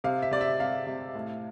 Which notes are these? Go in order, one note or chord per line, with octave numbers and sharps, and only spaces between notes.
C3 F5
E5
C3 D5
E5
C3 F5
C3
A2